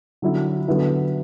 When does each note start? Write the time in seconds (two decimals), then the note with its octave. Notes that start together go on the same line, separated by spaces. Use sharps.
0.22 D3 F#3 C#4 E4
0.67 D3 F#3 B3 E4